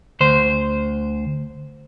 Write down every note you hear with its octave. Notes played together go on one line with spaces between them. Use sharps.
D2 C5